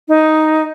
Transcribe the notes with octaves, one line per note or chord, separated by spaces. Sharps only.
D#4